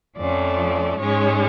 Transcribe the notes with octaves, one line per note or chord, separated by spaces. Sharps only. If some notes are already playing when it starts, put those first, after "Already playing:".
F2 F3 A3 C#4 D5
G#2 G#3 C#4 C#5